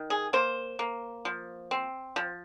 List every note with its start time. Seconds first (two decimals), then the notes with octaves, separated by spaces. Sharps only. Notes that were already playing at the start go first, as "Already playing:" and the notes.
Already playing: D#3
0.10 G#4
0.33 A#3 C5
0.79 A#3
1.25 F3
1.71 C4
2.16 F3